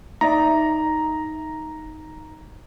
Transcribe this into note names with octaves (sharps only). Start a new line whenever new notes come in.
D#4 D5 E5 A#5